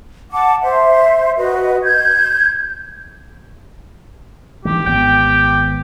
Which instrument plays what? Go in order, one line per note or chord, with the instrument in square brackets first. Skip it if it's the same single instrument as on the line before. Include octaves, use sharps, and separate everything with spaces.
[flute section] F#5 A5 D6
C5 E5
F#4 B4 D#5
G6 G#6
[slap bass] D#3 E3 G3 [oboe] G4
[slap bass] G#1 B3 [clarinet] G5